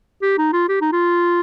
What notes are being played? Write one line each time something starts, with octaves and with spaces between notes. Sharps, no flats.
G4
D#4
F4
G4
D#4
F4